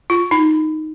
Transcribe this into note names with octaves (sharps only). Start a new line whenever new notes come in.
F4
D#4